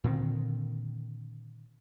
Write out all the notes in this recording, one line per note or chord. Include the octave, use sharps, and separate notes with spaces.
A#2 D3 D#3 C4